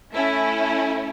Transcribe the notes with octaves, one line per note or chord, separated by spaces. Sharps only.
A3 C#4 E4 E5